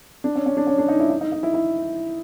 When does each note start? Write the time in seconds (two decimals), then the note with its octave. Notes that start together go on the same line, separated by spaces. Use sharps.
0.24 D4
0.35 C#4
0.46 C#4
0.57 D4
0.67 C#4
0.78 D4
0.88 D#4
1.00 E4
1.10 D#4
1.21 D#4
1.32 D#4
1.43 E4
1.54 E4